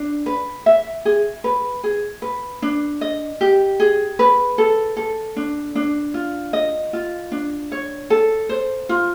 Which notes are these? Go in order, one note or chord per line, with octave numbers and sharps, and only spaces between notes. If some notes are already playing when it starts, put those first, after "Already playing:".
Already playing: D4
B4
E5
G#4
B4
G#4
B4
D4
D#5
G4
G#4
B4
A4
A4
D4
D4
F4
D#5
F4
D4
C#5
A4
C5
F4